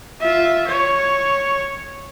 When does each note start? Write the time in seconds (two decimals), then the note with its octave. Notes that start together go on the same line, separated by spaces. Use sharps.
0.21 F4 E5
0.67 C#5